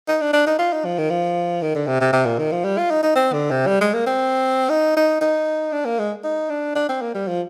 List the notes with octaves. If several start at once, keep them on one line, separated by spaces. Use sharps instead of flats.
D#4
D4
D4
D#4
F4
D#4
F3
D#3
F3
D#3
D3
C3
C3
C3
A#2
D#3
F3
G3
F4
D#4
D#4
C4
D3
C3
G3
G#3
A#3
C4
D#4
D#4
D#4
D4
A#3
G#3
D#4
D4
D4
C4
A#3
G3
F3